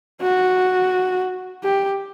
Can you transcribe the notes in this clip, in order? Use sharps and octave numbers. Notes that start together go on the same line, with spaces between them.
F#4
G4